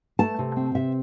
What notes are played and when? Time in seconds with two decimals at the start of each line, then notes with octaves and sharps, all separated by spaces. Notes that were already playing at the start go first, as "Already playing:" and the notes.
0.19 A3 A5
0.39 C3
0.56 C4
0.75 C3 E5